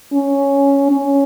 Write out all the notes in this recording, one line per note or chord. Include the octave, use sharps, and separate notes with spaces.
C#4
C#4